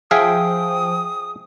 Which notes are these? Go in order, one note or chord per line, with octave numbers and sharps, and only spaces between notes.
F3 G#4 E5 F5 G5 D#6